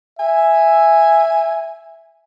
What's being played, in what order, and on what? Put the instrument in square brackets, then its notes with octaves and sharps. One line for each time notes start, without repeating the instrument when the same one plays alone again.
[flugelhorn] E5 [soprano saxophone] G#5